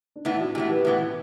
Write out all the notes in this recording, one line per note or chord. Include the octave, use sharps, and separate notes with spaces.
D4
A2 E3 B3 E4
F#4
A2 E3 B3 G4
B4
A2 E3 B3